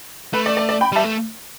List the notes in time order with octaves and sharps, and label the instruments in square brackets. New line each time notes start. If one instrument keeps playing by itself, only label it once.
[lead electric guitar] A3 [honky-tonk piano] B4
[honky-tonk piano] D5
D5
D5
G5 B5
[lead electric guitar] G3 [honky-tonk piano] E5 A5
[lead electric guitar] A3